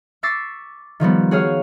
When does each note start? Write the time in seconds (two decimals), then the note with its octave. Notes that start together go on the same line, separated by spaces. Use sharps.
0.23 C#6 D6 E6 A6 B6 C7
1.00 D#3 F3 G3 B3
1.31 F#4 G#4 C#5 F5 F6